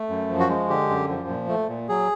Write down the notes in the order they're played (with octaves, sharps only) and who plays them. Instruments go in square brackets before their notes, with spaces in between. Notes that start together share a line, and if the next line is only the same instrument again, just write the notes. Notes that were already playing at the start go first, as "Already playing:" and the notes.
Already playing: [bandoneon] A3
F#2
F3
F#4
G#3
D3 G4
F#2
F3
A#2
A3
A#2
F#3 G#4